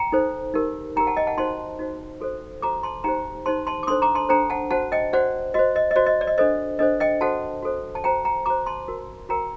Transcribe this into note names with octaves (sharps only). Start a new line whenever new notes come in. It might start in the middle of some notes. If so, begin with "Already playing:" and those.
Already playing: G5 A#5
D#4 A4 C5
D#4 G4 A#4
D#4 G4 A#4 G5 A#5
F#5 A5
D#5 G5
F#5 A5
D#4 F#4 C5 A5 C6
D#4 F#4 C5
F#4 A4 C5
F#4 A4 C5 A#5 D6
A5 C6
D#4 G4 C5 G5 A#5
D#4 G4 C5 A5 C6
A5 C6
D6
D4 A4 C5 C6 D#6
A#5 D6
A5 C6
D4 A4 C5 G5 A#5
F#5 A5
F#4 C5 F#5 A5
D#5 G5
F#4 C5 D5 F#5
F#4 C5 D#5
D#5
D#5
F#4 C5 D5
D#5
D5
D#5
D4 A4 C5 D#5
D4 A4 C5 D#5
D#5 G5
F#4 A4 C5 F#5 A5
F#4 A4 C5
A5
F#4 C5 G5 A#5
G5 A#5
F#4 C5 A#5 D6
A5 C6
F#4 A#4
F#4 A#4 G5 A#5